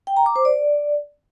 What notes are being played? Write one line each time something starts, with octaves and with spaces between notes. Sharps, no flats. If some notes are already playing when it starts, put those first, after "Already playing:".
G5
A#5
D6
C5
D5